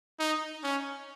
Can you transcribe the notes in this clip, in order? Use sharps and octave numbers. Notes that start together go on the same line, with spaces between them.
D#4
C#4